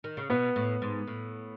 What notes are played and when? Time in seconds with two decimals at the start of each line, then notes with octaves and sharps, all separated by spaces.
0.04 D#3
0.17 C#3
0.30 B2 B3
0.56 A2
0.82 G#2
1.07 A2